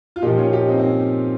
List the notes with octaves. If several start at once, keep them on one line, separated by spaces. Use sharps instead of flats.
F4
A#2 F3 D#4 G4
C#4 F4
D#4 G4
C4 D#4
C4